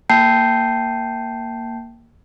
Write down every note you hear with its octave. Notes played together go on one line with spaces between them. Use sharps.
A#3 G5 A5 G6 C7